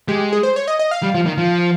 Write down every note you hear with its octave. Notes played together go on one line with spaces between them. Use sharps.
G#3 G4
G#4
C5
C#5
D#5
D#5
F5
G3
F3
D#3
F3